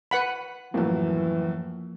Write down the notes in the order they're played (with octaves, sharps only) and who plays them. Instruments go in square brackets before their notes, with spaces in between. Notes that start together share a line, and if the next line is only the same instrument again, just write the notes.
[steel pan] B4 F#5 B5
[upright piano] F#2 A2 [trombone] E3 [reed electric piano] F3 A#3